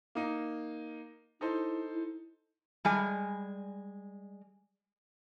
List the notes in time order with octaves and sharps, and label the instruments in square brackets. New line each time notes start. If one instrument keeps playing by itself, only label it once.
[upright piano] A#3 D#4
[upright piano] D#4 A4 C5 [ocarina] E4
[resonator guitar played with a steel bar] G3 G#3 G#5